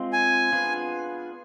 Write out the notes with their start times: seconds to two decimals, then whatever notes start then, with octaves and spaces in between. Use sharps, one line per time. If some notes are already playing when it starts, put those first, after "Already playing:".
Already playing: G#3 C4 F4
0.13 G#5
0.52 B3 D4 F4 G#4 B4